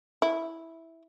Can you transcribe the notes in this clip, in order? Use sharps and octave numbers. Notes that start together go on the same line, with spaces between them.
E4